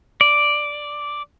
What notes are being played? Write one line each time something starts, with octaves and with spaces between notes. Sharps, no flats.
D5